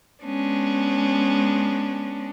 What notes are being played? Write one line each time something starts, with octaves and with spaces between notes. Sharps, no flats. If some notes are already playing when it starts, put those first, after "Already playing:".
G#3 B3 C#4 D4